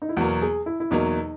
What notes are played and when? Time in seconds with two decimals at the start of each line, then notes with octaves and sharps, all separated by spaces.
0.02 D#4
0.09 E4
0.17 E2 B2 F#3 A#3 F#4
0.42 G#4
0.66 E4
0.80 E4
0.91 E2 B2 F#3 A#3 D#4